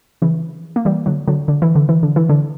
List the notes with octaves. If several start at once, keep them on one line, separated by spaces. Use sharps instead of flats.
C#3 E3
A#3
E3 G3
D3 F#3
D3 F#3
D3
E3
D3
E3
D3
E3
D3